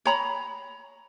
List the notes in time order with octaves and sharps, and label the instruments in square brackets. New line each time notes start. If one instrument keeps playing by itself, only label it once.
[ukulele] C#5 A#5 B5